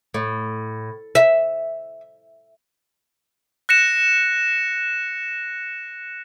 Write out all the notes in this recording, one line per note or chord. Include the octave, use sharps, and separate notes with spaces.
A2
E5
F#6 A#6 C#7 E7